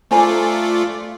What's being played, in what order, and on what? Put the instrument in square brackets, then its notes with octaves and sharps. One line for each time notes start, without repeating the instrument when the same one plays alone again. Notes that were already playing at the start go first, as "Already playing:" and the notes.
[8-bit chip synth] A3 F4 D5 [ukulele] C5 G#5 A#5